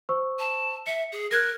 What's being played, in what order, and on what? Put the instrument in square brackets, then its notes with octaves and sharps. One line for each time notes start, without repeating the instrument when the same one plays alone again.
[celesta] C5 C#6 E6
[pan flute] A5
[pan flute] E5 [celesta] C#7
[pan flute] G#4
[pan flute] A#4 [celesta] F#6 G#6 A#6